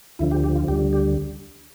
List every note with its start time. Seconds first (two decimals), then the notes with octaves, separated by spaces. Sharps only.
0.19 D2 D3 F3 E4
0.31 G4
0.44 G4
0.55 F4
0.68 D2 D3 G3 G4
0.93 G4